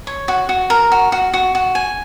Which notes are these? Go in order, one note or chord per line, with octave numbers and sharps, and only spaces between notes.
C#5
F#4
F#4
A#4
F#4
F#4
F#4
F#4
G#5